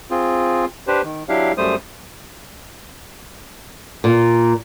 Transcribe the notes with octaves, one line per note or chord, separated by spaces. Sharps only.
C4 F4 G#4
D4 G4 B4 C5
D#3
F#3 D4 E4 G4 F5
F#2 G3 A3 C5 D#6
A#2